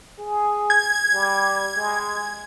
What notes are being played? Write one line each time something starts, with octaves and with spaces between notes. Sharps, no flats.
G#4
G#6
G3
G#3